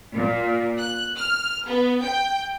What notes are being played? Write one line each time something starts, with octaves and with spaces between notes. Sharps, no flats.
A#2
F#6
F6
B3
G5